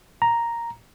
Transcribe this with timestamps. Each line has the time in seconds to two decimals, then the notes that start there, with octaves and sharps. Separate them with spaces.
0.22 A#5